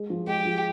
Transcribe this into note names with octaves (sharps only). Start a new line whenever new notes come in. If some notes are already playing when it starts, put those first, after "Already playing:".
Already playing: G#3
F3
G#3 G4
F3